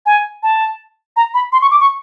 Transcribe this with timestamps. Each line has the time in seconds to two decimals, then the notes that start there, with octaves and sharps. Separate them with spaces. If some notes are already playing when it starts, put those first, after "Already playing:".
0.06 G#5
0.43 A5
1.16 A#5
1.34 B5
1.52 C6
1.62 C#6
1.71 D6
1.80 C#6